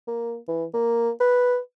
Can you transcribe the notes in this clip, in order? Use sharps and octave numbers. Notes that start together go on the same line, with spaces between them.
A#3
E3
A#3
B4